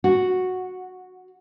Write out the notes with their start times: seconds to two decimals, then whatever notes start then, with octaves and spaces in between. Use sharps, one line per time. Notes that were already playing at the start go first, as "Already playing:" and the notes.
0.04 F#4